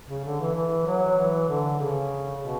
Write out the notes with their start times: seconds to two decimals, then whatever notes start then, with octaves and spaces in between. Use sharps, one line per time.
0.09 C#3
0.25 D3
0.40 E3
0.55 E3
0.86 F#3
1.17 E3
1.48 D3
1.79 C#3
2.41 B2